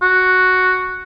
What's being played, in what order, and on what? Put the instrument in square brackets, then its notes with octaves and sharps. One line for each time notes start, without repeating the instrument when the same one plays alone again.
[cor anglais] F#4